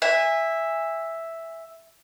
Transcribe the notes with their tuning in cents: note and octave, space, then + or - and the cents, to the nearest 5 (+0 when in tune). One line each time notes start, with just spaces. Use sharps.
E5 +0 G#5 -25